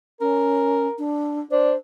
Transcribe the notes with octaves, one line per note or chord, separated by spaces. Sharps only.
C#4 A#4
D4
D4 C5